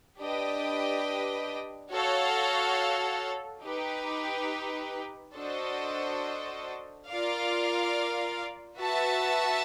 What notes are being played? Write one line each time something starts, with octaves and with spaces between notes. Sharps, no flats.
D4 G4 B4 D#5 G5
F#4 A4 C#5 F5
D#4 G4 B4
D4 F#4 A4 C5 D#5
F4 A#4 D5 F5
F#4 B4 E5 A5